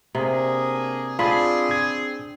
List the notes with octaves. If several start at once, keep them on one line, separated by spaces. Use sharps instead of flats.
C3 A#3 D4 G#4
C4 D4 F4 G#4 B5
G#6